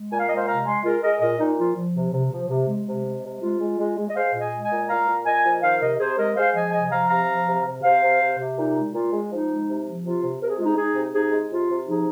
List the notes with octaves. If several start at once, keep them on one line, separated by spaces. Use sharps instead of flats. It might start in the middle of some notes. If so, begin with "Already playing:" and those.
Already playing: G#3
A#2 G#5
F5
G#3 D#5
C5 F5
C3 F5 A#5
G#3 G#5 C6
G#3 F4 A#4
G#3 A#4 D#5
A#2 A#4 D#5
A#2 D#4
F3 F4
F3
C3
C3
F3
C3
G#3
C3
G#3
C3
G#3 F4
G#3
G#3
G#3
D#5
G#3 C5 F5
A#2
D#5 G#5
G#3
D#5 G#5
A#2
A#2 F5 A#5
A#2
A#2 D#5 G#5
F3
D#3 C5 F5
C3 A#4 D#5
C3 G#4 C5
G#3 A#4 D#5
G#3 C5 F5
F3 D#5 G#5
C3 D#5 G#5
F3 F5 A#5
C3 F5 A#5
F3
C3
C3
C3 C5 F5
C3
C3
C3
A#2 D#4
G#3
A#2 F4
G#3
F3 D#4
G#3
C3
F3
C3 F4
C3
C3 A#4
G#4
G#3 F4
D#4 G#4
G#3 D#4 G#4
C3
C3 D#4 G#4
G#3
C3 F4
C3
F3 D#4 G#4